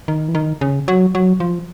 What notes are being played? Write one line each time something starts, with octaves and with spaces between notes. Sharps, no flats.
D#3
E3
D#3
C#3
F#3
F#3
F3